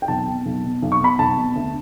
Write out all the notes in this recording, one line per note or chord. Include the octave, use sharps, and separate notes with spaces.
G5
B1 A5
B2
B1
B2
B1
C#6
B2 B5
B1 A5
B2
D2